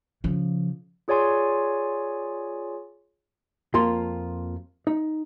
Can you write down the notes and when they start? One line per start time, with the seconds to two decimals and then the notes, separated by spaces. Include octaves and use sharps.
0.24 C#3 F3
1.08 F4 G#4 C#5 D5 G#5 C6
3.74 F2 F3 A#3 F4 C6
4.87 D#4